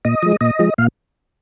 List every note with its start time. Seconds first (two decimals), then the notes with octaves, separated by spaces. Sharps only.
0.05 A#2 D#5
0.23 F3 G#3
0.41 A#2 D#5
0.59 F3 G#3
0.78 A#2 F5